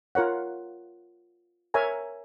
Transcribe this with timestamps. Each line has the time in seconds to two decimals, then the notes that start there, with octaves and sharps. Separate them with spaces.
0.15 F4 A#4 C#5 F#5
1.74 A#4 C#5 E5 G#5 A#5